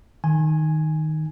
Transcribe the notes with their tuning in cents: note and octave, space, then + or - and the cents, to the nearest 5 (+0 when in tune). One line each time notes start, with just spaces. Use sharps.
D#3 +0 G#5 +0